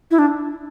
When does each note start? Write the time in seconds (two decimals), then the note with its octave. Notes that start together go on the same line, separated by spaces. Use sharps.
0.11 E4
0.19 D4